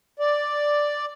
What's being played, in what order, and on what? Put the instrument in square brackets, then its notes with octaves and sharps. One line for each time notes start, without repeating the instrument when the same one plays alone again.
[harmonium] D5